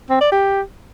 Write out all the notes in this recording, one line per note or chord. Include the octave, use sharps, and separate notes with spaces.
C4
D5
G4